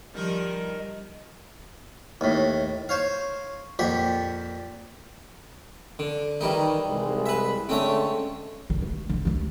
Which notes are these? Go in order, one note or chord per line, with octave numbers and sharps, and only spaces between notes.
D#3 F3 G3 D#4 A#4
D#2 A2
C5 C#5 F5
F2 A#2 G4 F#5
D3
D#3 E3 G3 D#4
C2 G#3
B4 E5
D3 G#3 A3 C4 C#4 C#5
D3 D#3
A3
D3 D#3
D2 A3